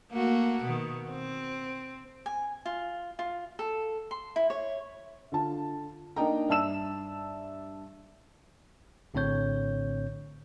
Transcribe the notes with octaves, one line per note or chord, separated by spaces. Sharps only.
A3 A#3 F#4
B2 D#3
C4
G#5
F4
F4
A4
C6
E4
C#5
D3 F4 A5
A#3 D4 D#4 D#5 G5 A#5
G2 D5 E5 A5 E6 E7
A#1 A2 D3 C4 C#5 G6